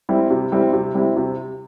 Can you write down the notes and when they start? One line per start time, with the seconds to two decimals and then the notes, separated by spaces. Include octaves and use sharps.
0.09 G3 C4 E4
0.30 C3
0.52 G3 C4 E4
0.73 C3
0.94 G3 C4 E4
1.17 C3